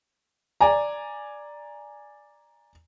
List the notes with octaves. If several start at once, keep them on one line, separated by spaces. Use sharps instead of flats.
D5 G#5 A#5